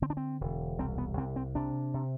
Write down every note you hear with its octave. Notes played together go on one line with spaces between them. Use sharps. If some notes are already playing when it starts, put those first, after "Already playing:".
D3 C4
D4
C4
E1
C2 C4
B3
C2 C4
C4
C3 D4
C3